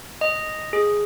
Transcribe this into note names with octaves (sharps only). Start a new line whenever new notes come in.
D#5
G#4